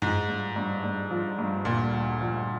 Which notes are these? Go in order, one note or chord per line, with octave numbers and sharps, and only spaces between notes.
G#2 F3
G2
G2
G2
F3
G2
D2 A#2
D2
F3